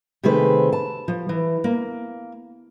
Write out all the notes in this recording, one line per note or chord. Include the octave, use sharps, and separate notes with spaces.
C3 D#3 A3 G#4 B4 C5
A5
F3
E3
A#3